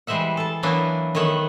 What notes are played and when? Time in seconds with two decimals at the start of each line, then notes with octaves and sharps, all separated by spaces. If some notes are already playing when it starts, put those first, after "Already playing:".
0.07 E3 G3 G#3 C5 E5 F#5
0.37 A4 A5
0.63 E3 F#3 A#3 B3 D4 E4
1.15 D#3 A3 B3 C#5 F#5